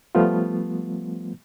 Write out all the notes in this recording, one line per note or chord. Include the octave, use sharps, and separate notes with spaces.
F3 G3 A3 B3 F4